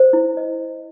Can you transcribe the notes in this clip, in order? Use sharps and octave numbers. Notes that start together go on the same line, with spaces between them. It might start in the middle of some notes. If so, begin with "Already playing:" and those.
Already playing: C5
E4
D#5